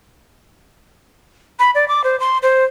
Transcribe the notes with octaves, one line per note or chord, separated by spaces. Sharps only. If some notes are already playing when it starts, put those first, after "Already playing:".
B5
D5
D6
C5
C6
C5